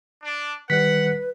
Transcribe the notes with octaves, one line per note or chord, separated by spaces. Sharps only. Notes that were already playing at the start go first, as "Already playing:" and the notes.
D4
D#3 G3 B4 F#5 B6